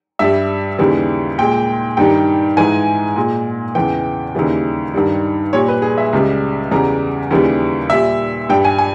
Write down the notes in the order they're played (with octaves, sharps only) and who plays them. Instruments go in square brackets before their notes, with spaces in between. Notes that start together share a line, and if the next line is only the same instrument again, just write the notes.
[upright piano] G2 G3 E5
D#2 C#3 E3 G3
A#2 G#3 G5
G2 D#3 G3 G5
G#2 E3 G#3 G#5
A#2 G#3
E2 C#3 E3 G5
D#2 C#3 E3 G3
G2 D#3 G3
A#2 G3 C#5
B4
G#4
E5
C#2 C#3 G3
E2 C#3 G3 A#5
D#2 C#3 E3 G3
A#2 G3 E5
G2 G3 G5
G#5
G#5